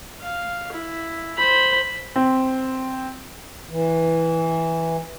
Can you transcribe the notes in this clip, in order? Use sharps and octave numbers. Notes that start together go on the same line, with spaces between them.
F5
E4
C5 B5
C4
E3